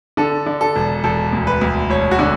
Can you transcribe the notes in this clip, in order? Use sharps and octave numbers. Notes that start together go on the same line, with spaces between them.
D3 A4
D3
A4
E1
E1 A4
D2
B4
D2
E1 C#5
F#4
D3